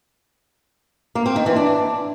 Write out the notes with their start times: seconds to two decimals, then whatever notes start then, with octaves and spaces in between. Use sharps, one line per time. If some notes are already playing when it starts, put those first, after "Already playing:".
1.15 A#3
1.26 C4
1.36 D#3
1.46 E3
1.56 D4